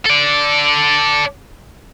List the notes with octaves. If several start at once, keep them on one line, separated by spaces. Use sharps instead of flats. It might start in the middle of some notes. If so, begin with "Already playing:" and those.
A4 D5